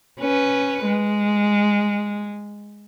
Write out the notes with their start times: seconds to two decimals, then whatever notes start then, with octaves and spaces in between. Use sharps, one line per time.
0.20 C#4 B4
0.86 G#3